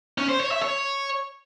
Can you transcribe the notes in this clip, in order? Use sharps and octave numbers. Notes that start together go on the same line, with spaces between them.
C#4
C5
C#5
E5
C#5